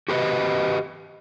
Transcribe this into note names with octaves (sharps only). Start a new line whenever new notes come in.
F#4 G4 B4 D5 D#5